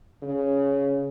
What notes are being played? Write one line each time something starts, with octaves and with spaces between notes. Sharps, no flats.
C#3